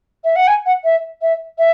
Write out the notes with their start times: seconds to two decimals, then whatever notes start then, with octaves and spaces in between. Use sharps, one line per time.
0.24 E5
0.36 F#5
0.47 G#5
0.66 F#5
0.84 E5
1.22 E5
1.58 E5